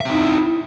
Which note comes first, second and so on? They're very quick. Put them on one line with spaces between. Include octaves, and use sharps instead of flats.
E5 C4 D#4 E4